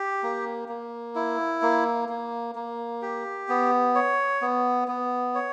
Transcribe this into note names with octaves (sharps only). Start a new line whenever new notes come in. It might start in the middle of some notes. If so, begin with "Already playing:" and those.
Already playing: G4
A#3
A#3
E4
A#3
A#3
A#3
G4
B3
C#5
B3
B3
C#5